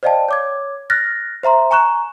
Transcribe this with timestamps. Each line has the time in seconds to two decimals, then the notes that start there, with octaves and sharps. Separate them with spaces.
0.03 C5 D5 D#5 F5 G5 A5
0.29 C#5 D6 G#6
0.90 F6 F#6 A6 A#6
1.43 C5 E5 A#5 C6
1.71 G#5 A#5 C#6 F#6 E7